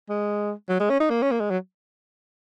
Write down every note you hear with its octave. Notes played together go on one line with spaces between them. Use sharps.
G#3
F#3
G#3
C#4
D#4
A#3
C#4
A#3
G#3
F#3